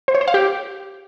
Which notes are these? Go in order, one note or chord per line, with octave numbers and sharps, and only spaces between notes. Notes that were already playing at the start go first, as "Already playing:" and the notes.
C5
C#5
C5
F5
G4